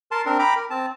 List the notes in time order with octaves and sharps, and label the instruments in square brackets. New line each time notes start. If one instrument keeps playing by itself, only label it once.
[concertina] A#4 A5 C6
C4 D4 A#4
G5 A#5 B5 D6
A#4
C4 A5